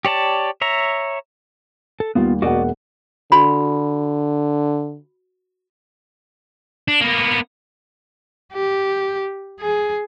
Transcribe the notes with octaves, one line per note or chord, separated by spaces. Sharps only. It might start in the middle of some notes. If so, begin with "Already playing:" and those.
G4 C#5 D5 A5
C#5 E5 A#5
A4
D#2 G3 B3 F4
E1 A#3 F#4 D5 D#5 F#5
D3 F#4 B5
D4
A#3 B3
G4
G#4